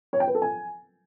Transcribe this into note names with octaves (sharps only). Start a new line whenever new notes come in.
C#5
G5
B4
A4
G#5